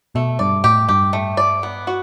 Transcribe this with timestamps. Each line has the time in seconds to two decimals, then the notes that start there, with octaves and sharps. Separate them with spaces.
0.15 B2 A3
0.39 G2 D5
0.64 A2 G4
0.89 G2 G4
1.13 A3
1.37 D5
1.63 B3
1.87 F#4